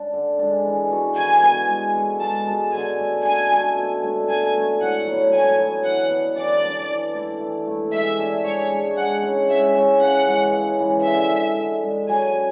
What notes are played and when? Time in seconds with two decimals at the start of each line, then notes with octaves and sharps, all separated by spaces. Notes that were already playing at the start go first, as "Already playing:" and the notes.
Already playing: D4
0.13 D3
0.39 G#3 D4
0.65 E3
0.91 B3 F#4 A4
1.16 E3 G#5
1.43 B3 F#4 A4
1.69 G#3
1.95 B3 F#4 A4
2.21 G#3 A5
2.47 B3 F#4 A4
2.73 D3 G#5
2.99 A3 D4 F#4
3.25 D3 G#5
3.51 A3 D4 F#4
3.77 B2
4.03 A3 D4
4.29 B2 G#5
4.55 A3 D4
4.81 A2 F#5
5.06 F#3
5.12 B3
5.33 A2 G#5
5.59 F#3 B3
5.84 E3 F#5
6.10 B3 D4
6.36 E3 D5
6.63 B3 D4
6.89 E3
7.15 A3 E4
7.40 E3
7.67 A3 E4
7.93 G#3 E5
8.19 D4 G#4
8.45 G#3 C#5
8.71 D4 G#4
8.97 G#3 F#5
9.23 C#4 E4
9.49 G#3 E5
9.75 C#4 E4
10.01 C#3 F#5
10.27 E3 G#3
10.53 C#3
10.79 E3 G#3
11.04 D3 E5
11.32 G#3 D4
11.58 D3
11.83 G#3 D4
12.09 F#3 G#5
12.35 C#4